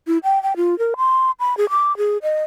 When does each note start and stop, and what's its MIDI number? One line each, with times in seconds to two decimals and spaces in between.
0.07 0.18 64
0.24 0.41 79
0.43 0.56 79
0.56 0.77 65
0.79 0.95 70
0.97 1.31 84
1.40 1.57 83
1.57 1.69 68
1.70 1.96 86
1.97 2.18 68
2.23 2.44 75